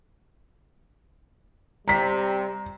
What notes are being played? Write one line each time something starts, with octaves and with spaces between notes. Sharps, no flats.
C3 G3 A#5 B6